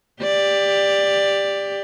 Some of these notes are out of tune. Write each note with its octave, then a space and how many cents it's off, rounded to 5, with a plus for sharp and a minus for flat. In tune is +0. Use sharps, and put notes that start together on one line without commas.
G4 +20 D5 +5